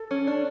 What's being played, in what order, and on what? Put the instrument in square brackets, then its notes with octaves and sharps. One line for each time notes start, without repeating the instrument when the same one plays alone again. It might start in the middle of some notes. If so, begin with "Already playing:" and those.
Already playing: [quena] A4
[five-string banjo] C#4
D4